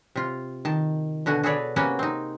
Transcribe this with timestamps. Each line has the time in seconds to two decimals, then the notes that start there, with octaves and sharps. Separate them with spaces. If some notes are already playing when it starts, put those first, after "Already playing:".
0.16 C3 F4
0.65 D#3 A5
1.26 B2 D3 F#4 G#5
1.43 F#4 G#4 A4 B4 C#5 D5
1.76 C3 A#3 B3 C#4 F#4 G#5
1.99 C4 D#4